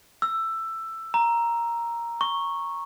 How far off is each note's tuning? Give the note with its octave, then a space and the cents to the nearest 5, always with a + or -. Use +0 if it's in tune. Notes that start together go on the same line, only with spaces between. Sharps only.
E6 +10
A#5 +5
C#6 -10